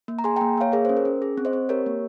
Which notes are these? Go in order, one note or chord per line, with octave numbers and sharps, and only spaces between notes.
A#3
A#5
G#4 G#5 C6
A#3 G5 A#5
A#3 C#5 F5
G#4 A#4 C#5
C#4 C5
A#4
C#4
G#4
C4
C5 D#5
C4
G4 A#4 C#5
A#3